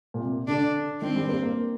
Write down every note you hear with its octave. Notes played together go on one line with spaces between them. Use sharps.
A#2
C3
D3 D4
D#3 C4
G3
A#3
A#3